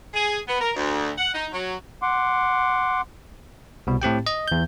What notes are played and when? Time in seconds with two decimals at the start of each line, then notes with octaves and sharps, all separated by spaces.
0.14 G#4
0.47 B3
0.61 A#4
0.75 D2
1.18 F#5
1.34 D#4
1.52 F#3
2.02 F#5 C6 D6
3.87 C2 B2
4.02 A2 C4 G4 G5
4.27 D#5
4.48 E2 G6